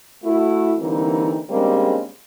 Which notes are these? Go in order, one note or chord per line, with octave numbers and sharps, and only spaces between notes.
A3 E4 F#4
D3 E3 G3 A#3 C4 D#4
C#3 G3 G#3 A#3 C4 D4